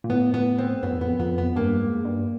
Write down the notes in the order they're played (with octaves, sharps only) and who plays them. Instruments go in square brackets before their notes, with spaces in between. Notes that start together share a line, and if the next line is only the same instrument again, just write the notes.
[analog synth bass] A#2
[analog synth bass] A2 [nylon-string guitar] B3
[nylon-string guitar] B3
C4
[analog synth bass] F#2 [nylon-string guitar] B3
[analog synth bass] F2
E2
[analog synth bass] F2 [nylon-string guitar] B3
[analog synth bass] F2 [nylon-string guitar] B3
[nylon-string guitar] B3
[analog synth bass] G2 [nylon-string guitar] A#3
[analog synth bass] G#2
G2